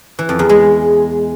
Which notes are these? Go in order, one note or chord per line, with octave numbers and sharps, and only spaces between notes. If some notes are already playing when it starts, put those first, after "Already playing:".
E3
F2
E2
G#3